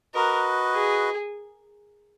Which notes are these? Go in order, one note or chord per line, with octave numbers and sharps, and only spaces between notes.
F#4 A#4 B4 D#5
G#4